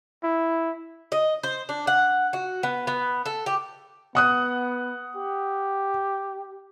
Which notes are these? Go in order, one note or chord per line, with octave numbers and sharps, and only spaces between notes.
E4
D#5
C5
D4
F#5
F#4
B3
B3
A4
G4
B3 F#5 D#6 F#6
G4